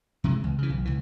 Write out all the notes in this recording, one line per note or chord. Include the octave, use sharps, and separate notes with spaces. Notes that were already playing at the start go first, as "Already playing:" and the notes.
C3 E3 G3 G#3
C#2
C#3 E3
B1
C#2 E3